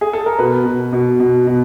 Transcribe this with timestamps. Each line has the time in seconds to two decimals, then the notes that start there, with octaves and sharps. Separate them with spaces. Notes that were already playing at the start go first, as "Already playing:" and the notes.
0.01 G#4
0.13 A4
0.26 A#4
0.38 B2 B4
0.65 B2
0.93 B2
1.20 B2
1.47 B2